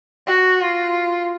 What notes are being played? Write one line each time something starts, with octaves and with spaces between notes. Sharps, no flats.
F#4
F4